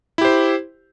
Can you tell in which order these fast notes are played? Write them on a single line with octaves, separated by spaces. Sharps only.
E4 G4 C5